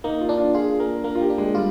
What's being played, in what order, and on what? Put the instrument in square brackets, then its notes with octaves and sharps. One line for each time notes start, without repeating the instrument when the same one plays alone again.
[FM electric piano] A#3 [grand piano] D#4
[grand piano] F4
[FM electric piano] D4
[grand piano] F4
[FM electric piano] F4 [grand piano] G#4
[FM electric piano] A#3 [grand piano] A#4
[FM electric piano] A#3 [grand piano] A#4
[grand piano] F4
G4
[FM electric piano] D4
[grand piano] G#3
[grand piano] G3 [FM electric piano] F4